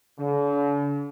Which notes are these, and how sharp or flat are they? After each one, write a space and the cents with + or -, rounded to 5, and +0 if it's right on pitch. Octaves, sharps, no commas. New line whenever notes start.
D3 -45